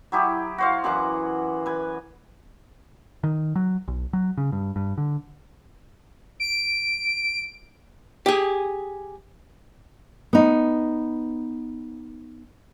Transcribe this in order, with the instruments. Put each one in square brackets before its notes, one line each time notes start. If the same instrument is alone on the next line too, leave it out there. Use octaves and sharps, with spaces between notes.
[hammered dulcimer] F#3 E4 G4 G#4
F#4 C5 F5
F#2 E3 F#5 D6
B4 G#5
[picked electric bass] D#3
F#3
B1
F#3
C#3
G2
G2
D3
[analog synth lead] D7
[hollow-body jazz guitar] G4 G#4
[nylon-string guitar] B3 D#4